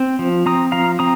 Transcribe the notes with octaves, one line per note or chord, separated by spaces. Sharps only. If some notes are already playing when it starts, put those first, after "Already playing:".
Already playing: C4
F3
C4 A#5 D#6
F3 F5 A#5
C4 A#5 D#6